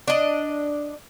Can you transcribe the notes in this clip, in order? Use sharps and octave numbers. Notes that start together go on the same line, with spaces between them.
D4 D#5